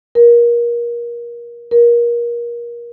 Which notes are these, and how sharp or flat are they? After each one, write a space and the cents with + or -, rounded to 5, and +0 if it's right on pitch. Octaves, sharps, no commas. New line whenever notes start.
A#4 +25
A#4 +25